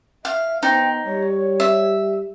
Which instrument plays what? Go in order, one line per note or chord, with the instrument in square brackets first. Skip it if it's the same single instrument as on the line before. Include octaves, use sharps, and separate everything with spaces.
[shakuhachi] E5 [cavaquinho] F5
[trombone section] B3 C5 [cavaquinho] D#4 [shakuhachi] G5
[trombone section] G3 [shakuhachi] C#5
[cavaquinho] E5